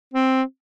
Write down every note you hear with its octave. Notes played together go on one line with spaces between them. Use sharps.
C4